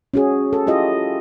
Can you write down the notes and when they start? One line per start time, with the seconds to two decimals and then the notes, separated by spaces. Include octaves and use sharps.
0.14 C#4 F#4 G#4
0.53 A4
0.67 E4 F4 G4 D#5